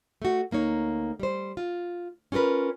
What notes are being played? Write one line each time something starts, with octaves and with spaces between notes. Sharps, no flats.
A3 F#4
D2 A#3 D#4 C#5
G3 C5
F4
C#4 F4 G4 A#4 B4